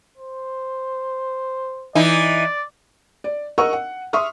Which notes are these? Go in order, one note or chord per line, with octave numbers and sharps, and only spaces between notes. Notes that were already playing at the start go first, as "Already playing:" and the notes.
C5
E3 D#4 D5
D5
A#4 D#5 F#5 C#6 E6
F#5
E5 C6 C#6 D#6 F6